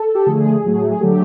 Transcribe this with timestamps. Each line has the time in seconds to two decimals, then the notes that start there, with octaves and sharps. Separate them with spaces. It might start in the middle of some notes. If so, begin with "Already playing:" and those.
Already playing: A4
0.15 G4
0.26 D3 F3 A3 G#4
0.64 A2 F#3 A3
0.91 G#4
1.01 D3 F#3 A3 G4